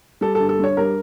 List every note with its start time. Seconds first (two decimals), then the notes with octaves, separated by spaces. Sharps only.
0.21 G3 A4
0.35 G1 A4
0.49 A4
0.59 G2 C#5
0.77 G3 A#4